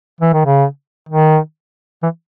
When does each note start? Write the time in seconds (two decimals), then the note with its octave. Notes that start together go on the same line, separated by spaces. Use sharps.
0.21 E3
0.33 D#3
0.45 C#3
1.09 D#3
2.03 E3